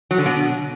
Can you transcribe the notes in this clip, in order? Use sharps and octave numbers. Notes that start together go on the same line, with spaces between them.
F#3
D3
B2